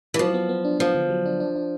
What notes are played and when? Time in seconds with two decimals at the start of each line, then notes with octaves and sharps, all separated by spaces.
0.14 E3
0.19 F3 F#3
0.34 B3
0.49 B3
0.65 D4
0.79 F3 B3
0.95 D3
1.10 F#3
1.26 D4
1.40 D4
1.56 D4